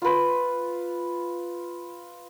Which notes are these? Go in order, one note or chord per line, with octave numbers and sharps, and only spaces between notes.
F4 B4